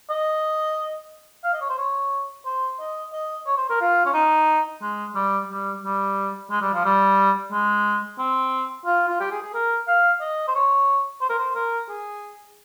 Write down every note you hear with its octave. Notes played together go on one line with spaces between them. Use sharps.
D#5
F5
D#5
C#5
C5
C#5
C5
D#5
D#5
C#5
C5
A#4
F4
C#4
D#4
G#3
G3
G3
G3
G#3
G3
F3
G3
G#3
C4
F4
F4
G4
G#4
G#4
A#4
F5
D#5
C5
C#5
C5
A#4
C5
A#4
G#4